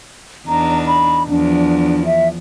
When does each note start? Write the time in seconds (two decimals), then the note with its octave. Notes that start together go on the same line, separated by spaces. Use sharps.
0.48 E2 D4 D#4 A#5
0.87 B5
1.30 E2 F3 D4
2.05 E5